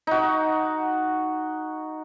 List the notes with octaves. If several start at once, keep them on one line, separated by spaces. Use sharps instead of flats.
D#4 F#4